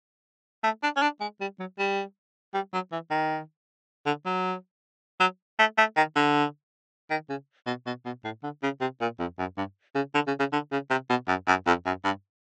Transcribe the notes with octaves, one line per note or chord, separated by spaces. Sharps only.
A3
D4
C#4
D4
G#3
G3
F#3
G3
G3
F#3
E3
D#3
D3
F#3
F#3
A3
A3
D#3
D3
D#3
C#3
B2
B2
B2
A2
D3
C#3
C3
A#2
F2
F#2
G2
C#3
D3
C#3
C#3
D3
C#3
C3
B2
F#2
F#2
F2
F#2
G2